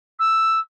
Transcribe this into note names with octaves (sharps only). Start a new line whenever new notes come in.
E6